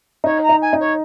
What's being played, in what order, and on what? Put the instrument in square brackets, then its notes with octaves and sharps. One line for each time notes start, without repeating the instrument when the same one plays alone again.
[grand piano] D#4 [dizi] C#5
[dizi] A#5
[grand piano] D#4
[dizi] G#5
[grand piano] D#4
[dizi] C#5